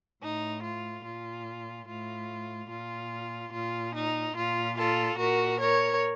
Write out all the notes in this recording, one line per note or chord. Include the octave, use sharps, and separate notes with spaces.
A2 D#4
F4
A#2 F4
A2 F4
A#2 F4
A#2 F4
D#4
A#2 F4
F4 A4
A#2 F#4 A#4
A#4 C#5